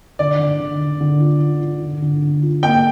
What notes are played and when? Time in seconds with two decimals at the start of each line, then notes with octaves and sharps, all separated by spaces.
0.19 D3 D5
0.39 D3
0.60 D3
0.81 D3
1.01 D3
1.20 F4
1.41 F4
1.61 F4
1.82 D3
2.02 D3
2.22 D3
2.42 F4
2.63 A#3 G5